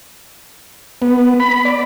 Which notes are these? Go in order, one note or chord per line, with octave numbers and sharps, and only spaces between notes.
B3
B5
D5